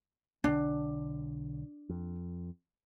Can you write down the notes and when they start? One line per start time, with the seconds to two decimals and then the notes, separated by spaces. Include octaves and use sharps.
0.44 B1 D3 D4
1.89 F2